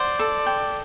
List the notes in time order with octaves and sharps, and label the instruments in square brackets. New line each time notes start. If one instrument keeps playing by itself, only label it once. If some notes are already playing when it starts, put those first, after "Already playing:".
Already playing: [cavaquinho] C5 F#5 [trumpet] D5
[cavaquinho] A4
G5